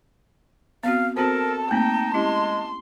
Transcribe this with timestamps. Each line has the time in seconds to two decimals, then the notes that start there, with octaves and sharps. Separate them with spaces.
0.83 B3 C4 F#4 F5
1.17 C4 F#4 A4 A#4 C5 A5
1.71 A3 A#3 C4 D#4 G5
2.14 G#3 C#4 E4 G4 C6